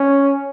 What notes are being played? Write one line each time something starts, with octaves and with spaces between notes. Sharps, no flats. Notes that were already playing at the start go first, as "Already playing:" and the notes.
Already playing: C#4